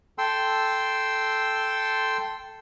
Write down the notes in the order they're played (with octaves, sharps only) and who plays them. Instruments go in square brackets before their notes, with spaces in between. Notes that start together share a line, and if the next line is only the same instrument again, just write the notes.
[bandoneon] A4 G5 C6 E6